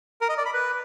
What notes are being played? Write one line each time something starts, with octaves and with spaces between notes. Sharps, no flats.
A#4
D#5
D5
B5
B4